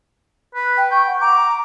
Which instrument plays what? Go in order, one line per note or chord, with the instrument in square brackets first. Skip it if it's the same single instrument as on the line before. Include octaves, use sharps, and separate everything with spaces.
[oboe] B4
[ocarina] G5
[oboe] G5 [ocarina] C#6
[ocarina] F#5
[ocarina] A#5 [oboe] D6